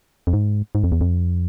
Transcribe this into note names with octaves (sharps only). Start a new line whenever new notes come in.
F2
G#2
G#2
F2
E2
F2